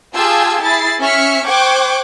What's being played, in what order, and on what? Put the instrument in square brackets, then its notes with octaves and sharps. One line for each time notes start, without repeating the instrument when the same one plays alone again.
[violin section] F4 G4 G#4 A5 E6 G#6
E4 G#4 A6 C7
C#4 E5 F6 B6 C#7
C5 G5 C#6 D6 F#6 G#6